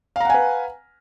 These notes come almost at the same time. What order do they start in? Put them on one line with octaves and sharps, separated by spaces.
F5 A#5 F#5 G#5 B4